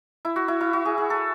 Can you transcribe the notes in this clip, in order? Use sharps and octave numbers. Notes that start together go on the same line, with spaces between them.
E4
F#4
E4
E4
F#4
G#4
G#4
A4